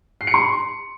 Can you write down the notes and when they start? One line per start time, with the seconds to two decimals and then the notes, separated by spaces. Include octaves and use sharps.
0.21 C7
0.27 C#7
0.34 C6